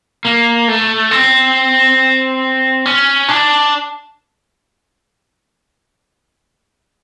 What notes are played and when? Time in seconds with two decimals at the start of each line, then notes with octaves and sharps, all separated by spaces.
0.25 A#3
0.68 A3
1.11 C4
2.86 C#4
3.28 D4